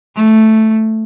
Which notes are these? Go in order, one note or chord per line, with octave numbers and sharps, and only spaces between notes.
A3